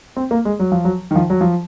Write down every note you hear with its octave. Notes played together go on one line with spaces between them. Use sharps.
C4
A#3
G#3
F#3
F3
F#3
D#3
F3
F#3
F3